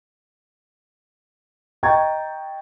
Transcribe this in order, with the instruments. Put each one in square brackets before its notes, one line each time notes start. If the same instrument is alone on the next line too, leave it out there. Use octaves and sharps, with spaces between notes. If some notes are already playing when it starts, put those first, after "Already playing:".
[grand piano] D#5 G5 A#5 C#6 G#6 A6